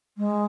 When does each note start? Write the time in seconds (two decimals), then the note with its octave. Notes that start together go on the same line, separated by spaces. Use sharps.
0.17 G#3